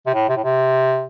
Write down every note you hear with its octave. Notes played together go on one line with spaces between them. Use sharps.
C3
A2
C3
A2
C3